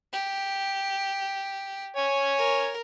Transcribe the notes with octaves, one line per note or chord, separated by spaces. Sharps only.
G4
C#5 G#5
A#4